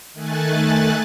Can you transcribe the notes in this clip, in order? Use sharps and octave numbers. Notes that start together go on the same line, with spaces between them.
D#3 A3 G#5 F#6 A6